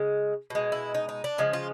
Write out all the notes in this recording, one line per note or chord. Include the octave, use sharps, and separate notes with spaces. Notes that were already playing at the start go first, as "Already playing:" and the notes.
Already playing: C#3 G#3
B2 G#3
E4
D#4
D#4
D4
C#3 F3 G#3
F4